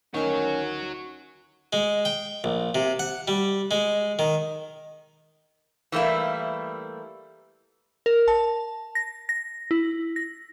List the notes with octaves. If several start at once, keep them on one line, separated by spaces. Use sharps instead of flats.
D2 D#3 C#4 D#4 F#4 A#4 C#5
G#3
G5
A#1
C3
F#5
G3
G#3
D#3
E3 G3 A3 A#3 E4
A#4
A5
A#6
A#6
E4
A#6